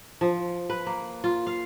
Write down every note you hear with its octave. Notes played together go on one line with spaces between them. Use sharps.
F3
B4
A#3
F4
F5